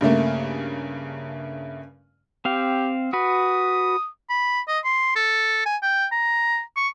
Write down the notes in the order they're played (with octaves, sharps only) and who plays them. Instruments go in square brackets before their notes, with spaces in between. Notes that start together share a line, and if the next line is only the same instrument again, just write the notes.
[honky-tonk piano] G2 C#3 A3 A#3
[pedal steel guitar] C4 F5 [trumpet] G4
[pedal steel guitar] F#4 B4 [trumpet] D#6
[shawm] B5
D#5
C6
A4
G#5
G5
A#5
C#6